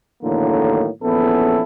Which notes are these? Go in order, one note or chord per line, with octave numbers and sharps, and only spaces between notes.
E2 A2 D3 D#3 F#3 A#3
A#1 E2 B3 C#4 E4 A4